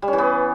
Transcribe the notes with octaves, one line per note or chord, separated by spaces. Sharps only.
G3
C#4
E3
B3